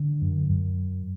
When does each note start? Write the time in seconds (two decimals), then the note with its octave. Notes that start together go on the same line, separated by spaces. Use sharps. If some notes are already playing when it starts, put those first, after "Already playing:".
Already playing: D3
0.22 F#2
0.49 F#2